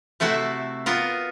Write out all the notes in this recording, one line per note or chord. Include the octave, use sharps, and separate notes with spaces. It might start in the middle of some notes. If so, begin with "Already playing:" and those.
C3 A3 C4 E4 F#4
B3 F4 A#4